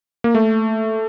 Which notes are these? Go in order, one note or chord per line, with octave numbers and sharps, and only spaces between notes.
A#3
A3